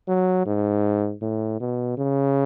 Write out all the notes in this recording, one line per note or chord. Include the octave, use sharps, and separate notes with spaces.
F#3
G#2
A2
B2
C#3